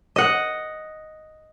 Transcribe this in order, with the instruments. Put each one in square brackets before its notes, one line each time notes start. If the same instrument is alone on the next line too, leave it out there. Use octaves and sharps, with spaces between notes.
[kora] D#5 F#5